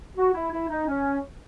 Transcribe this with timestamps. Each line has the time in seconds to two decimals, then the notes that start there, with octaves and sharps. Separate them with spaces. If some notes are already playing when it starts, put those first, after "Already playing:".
0.16 F#4
0.34 E4
0.52 E4
0.69 D#4
0.87 C#4